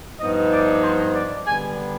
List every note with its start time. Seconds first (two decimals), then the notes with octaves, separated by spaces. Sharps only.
0.19 G2 F3 B3 D#4 D#5
0.51 D5
0.83 C5
1.15 D5
1.46 D3 G3 B3 G#5